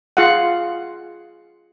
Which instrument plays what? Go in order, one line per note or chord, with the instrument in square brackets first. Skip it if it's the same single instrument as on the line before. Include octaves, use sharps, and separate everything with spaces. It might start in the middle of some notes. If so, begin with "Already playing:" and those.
[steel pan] F4 G#4 F5 F#5